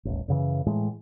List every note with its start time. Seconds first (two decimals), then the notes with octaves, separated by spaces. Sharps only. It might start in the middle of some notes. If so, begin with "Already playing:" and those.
0.05 D#1 A1
0.28 F#2 C#3 E3
0.66 A2 E3 G#3